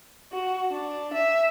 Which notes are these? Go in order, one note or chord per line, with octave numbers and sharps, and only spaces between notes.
F#4
D4
E5